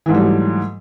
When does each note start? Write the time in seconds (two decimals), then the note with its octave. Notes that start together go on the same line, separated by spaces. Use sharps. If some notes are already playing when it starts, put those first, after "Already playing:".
0.06 E3
0.09 G#2
0.12 A3
0.14 G3
0.17 F#3